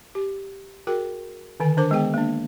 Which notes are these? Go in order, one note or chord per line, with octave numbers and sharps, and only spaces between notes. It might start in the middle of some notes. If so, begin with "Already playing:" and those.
G4
F#4 G#4 A#4 G5
D3 D#3 G#5
D4 A#4 C5 D6
G#3 B3 G#4 G5
A#3 D4